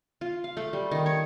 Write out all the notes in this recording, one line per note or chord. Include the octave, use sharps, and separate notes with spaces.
F4
F5
A3
G3
D#3
C#5